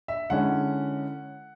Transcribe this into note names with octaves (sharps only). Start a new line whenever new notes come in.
E5
D3 G#3 C#4 E4 F#5